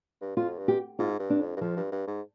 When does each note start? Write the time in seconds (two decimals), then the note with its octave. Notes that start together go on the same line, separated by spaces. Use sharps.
0.21 G2
0.36 F2 F4
0.58 G2
0.68 G4
0.99 G#2 F4
1.19 G2
1.30 D4
1.40 F2
1.57 G2
1.61 F2 F3
1.77 G2
1.92 G2
2.07 G#2